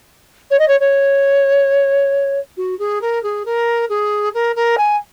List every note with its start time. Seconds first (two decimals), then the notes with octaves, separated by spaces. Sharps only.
0.50 C#5
0.59 D#5
0.68 C#5
0.80 C#5
2.57 F#4
2.79 G#4
3.01 A#4
3.23 G#4
3.45 A#4
3.89 G#4
4.34 A#4
4.55 A#4
4.77 G#5